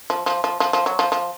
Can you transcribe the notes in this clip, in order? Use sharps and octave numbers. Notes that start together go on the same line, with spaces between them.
F3
F3
F3
F3
F3
F#3
F3
F3